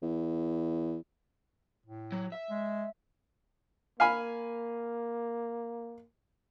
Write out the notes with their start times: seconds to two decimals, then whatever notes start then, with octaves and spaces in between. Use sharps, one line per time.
0.02 E2
1.86 A2
2.12 F#3
2.32 E5
2.50 G#3
4.00 A#3 F5 G#5 B5